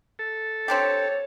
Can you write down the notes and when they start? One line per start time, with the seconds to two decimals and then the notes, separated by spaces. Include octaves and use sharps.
0.19 A4
0.68 C4 D4 G4 C#5